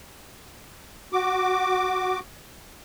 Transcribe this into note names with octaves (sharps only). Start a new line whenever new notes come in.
F#4 D6